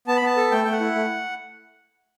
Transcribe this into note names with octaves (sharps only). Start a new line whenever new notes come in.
B3 A5
B5
B3 A5
A4
A3 G5
A3 G5
F#5
E4
A3